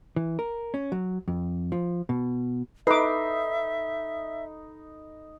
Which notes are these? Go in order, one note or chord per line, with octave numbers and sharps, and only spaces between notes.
E3
A#4
C#4
F#3
F2
F3
B2
D#4 A4 B4 E5 B5 D6 C7